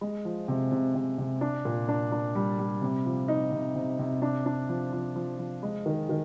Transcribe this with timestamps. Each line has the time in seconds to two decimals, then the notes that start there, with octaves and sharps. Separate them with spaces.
0.01 G#3
0.25 F3
0.48 C3
0.72 C3
0.95 C3
1.18 C3
1.41 D4
1.65 A#2
1.89 D4
2.12 D4
2.35 G3
2.59 G3
2.82 C3
3.05 F3
3.28 D#4
3.52 C3
3.75 C3
3.99 C3
4.22 D4
4.46 D4
4.69 F3
4.92 F3
5.16 F3
5.39 F3
5.63 G#3
5.86 D#3
6.09 D#3